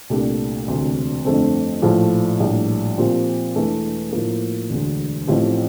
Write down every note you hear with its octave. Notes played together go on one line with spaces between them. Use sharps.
C2 A#2 A3 D4 G4
E1 D2 C3
G1 F2 D3 A3 C4
A#1 A2 F3 A3
A#1 A2 G3 D4
A#2 F3 C4 G4
E1 E2 E3 A3 D4
A2 F3 A#3
E1 D2 D3
A1 A2 F3 C4 G4